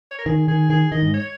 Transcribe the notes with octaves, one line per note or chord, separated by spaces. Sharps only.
C#5
A#4
D#3 G#4
D#3 G#4
D#3 G#4
D#3 D#5
G#2
C#5